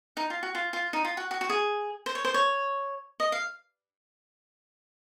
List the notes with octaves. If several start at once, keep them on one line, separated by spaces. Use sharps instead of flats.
D#4
F4
F#4
F4
F4
D#4
F4
F#4
F#4
F#4
G#4
C5
C#5
C5
C#5
D#5
F5